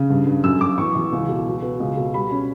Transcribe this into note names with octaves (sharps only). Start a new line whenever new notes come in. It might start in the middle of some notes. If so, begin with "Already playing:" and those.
Already playing: C#3
G2
G2
F#2 E6
F#2 D6
E2 C#6
E2
C#2
B2
F#3
B3
C#2
B2
G3 B5
C#4